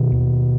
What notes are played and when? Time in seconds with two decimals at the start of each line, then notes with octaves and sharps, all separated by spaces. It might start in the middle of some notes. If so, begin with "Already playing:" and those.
Already playing: B2 D#3
0.12 D#2